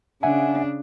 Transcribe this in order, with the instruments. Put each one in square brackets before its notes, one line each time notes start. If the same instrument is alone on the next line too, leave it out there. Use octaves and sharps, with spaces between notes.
[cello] C#3 D4 [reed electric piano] E5 F#5 G#5